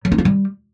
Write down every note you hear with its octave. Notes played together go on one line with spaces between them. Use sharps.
F#3
D#4
F4
G3